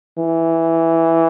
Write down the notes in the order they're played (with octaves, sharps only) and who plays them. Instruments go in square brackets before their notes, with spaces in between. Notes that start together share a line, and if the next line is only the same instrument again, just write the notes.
[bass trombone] E3